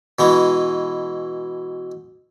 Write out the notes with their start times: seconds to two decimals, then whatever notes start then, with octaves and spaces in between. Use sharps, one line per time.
0.19 B2 E3 G#3